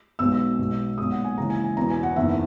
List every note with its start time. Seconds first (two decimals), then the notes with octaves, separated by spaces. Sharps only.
0.19 B1 B2 G#3 E6
0.59 B1 B2 G#3
0.98 B1 A#2 G#3 D#6
1.11 F#5
1.25 G#5
1.38 D#2 C#3 E3 G#3 A#5
1.50 G#5
1.64 G#5
1.77 E1 E2 B2 A#5
1.90 G#5
2.03 F#5
2.16 F#1 E2 D#3 E5